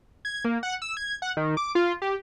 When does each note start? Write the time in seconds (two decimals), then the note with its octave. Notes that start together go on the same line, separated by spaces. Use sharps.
0.25 G#6
0.45 A#3
0.63 F#5
0.82 E6
0.97 G#6
1.22 F#5
1.37 D#3
1.57 D6
1.75 F4
2.02 G4